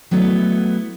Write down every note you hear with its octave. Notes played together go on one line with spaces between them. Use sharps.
F#3 A3 B3 E4